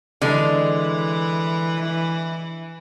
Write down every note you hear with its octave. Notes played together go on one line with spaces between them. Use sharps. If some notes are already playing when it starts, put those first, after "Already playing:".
D3 E3 G#3 E4